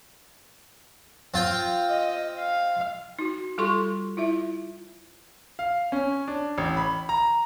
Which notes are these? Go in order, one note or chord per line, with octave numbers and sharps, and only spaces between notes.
C4 F4 G5
D#5
F5
D#4 F#4
G3 F4 G4 A4 C6 C#6
E4 F4 E5
F5
C#4
D4
A1
B5
A#5